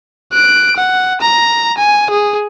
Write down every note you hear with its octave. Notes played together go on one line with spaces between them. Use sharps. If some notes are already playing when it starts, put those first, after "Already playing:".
F#6 D7
F#5
A#5
G#5
G#4